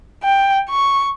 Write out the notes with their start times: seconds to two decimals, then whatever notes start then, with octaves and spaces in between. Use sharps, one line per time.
0.24 G5
0.70 C#6